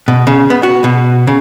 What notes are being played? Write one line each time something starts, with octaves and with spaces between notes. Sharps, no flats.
B2
C#3
B3
F#4
B2
C#3